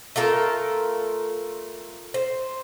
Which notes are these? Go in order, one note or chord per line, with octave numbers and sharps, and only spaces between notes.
A3 F4 A4 A#4
C5